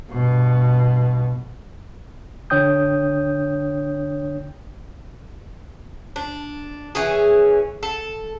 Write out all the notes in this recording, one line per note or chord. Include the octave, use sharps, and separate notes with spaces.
G2 B2
D3 D4 C#5 G5 D#6 G6
D4
E3 C#4 G#4
A4